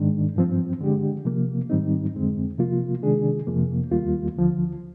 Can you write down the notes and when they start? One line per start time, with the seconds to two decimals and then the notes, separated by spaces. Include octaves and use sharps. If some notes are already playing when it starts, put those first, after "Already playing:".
Already playing: G#2 D#3 G#3 D4
0.36 G2 F3 C4
0.81 D3 G#3 D4 G4
1.25 C3 F3 A#3
1.70 G#2 D#3 G3 C4 D#4
2.14 F2 D3 G#3 C4
2.58 C3 F3 A#3 F4
3.02 C3 D#3 G#3 D4 G#4
3.47 F2 C3 F3 A#3
3.91 D#2 D#3 G3 A#3 F4
4.36 D2 D3 F3